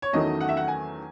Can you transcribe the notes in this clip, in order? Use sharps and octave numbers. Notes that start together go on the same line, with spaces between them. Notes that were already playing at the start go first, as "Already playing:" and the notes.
C#5
E2 D#3 F#3 A3 C#4 D#5
F#5
E5
F#5
G#5